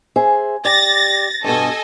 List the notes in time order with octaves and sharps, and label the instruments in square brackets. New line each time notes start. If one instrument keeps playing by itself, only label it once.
[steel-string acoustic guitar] G#4 C5 E5
[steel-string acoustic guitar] G4 D5 [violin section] A6 A#6
[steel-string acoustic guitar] G2 B2 [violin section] A4 D#5 G#5